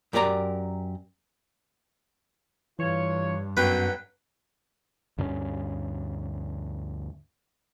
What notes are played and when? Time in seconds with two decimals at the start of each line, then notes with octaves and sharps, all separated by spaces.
0.13 F#2 G4 A#4 D5 A#5
2.79 G2 E3 F4 C#5
3.57 F#2 D3 D#3 F#3 B3 F#4 B4 G5
5.18 D2 G2 A#3 C#4